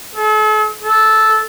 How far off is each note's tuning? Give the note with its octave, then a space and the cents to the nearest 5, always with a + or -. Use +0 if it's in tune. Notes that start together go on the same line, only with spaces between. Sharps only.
A4 -45
A4 -10